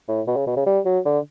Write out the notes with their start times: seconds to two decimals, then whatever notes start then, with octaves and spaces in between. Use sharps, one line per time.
0.08 A2
0.27 B2
0.36 C#3
0.47 B2
0.56 C#3
0.66 G3
0.85 F#3
1.05 D3